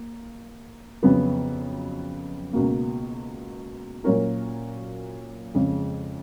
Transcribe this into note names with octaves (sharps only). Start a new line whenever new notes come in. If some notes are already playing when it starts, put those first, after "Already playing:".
Already playing: A#3
F2 C#3 F#3 B3
C#2 B2 A#3
A#2 F#3 C#4 F#4 A#4
F2 C#3 G#3